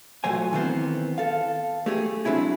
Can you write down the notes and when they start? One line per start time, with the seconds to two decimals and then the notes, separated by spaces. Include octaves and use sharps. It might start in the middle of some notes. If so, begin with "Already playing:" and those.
0.24 B1 A#2 F#3 A3 C5 G#5
0.53 D#3 E3 B3 C4 E4 C5
1.18 A4 F5
1.86 A3 G4 G#4
2.25 F#3 C4 D4 E4 G#4